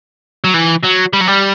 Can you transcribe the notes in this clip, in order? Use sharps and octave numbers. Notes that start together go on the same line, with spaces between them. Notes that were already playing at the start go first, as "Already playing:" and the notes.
F#3
E3
F#3
G3
F#3
G3